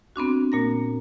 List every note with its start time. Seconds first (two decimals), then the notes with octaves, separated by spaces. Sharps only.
0.16 B3 C4 D4 F#4
0.52 A#2 A#3 A#6